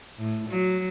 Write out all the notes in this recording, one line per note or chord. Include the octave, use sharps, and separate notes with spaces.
A2
F#3